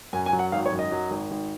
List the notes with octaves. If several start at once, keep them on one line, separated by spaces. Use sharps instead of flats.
F#2 G#5
G#5
F#3
F#5
G#1 F5
C#5
F#2
D#5
F#3
G#1
G#1